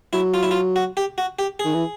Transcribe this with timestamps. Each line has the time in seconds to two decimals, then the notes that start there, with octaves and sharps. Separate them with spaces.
0.13 F#3 E4
0.34 F4
0.43 E4
0.51 F4
0.76 F#4
0.97 G4
1.18 F#4
1.39 G4
1.59 G#4
1.65 D#3
1.74 E3